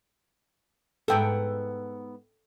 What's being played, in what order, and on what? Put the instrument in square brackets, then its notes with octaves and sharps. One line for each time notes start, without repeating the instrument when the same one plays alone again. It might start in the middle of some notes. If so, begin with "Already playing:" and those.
[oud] G#2 B3 E5 [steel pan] A4 G5